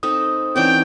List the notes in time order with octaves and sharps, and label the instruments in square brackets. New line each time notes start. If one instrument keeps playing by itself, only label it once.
[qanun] C4 D#4 A4 [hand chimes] D#6
[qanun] E3 C#4 D5 [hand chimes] C4 D#4 [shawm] G5